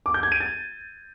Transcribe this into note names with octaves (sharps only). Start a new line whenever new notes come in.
D6
G6
G#6
D#7
A6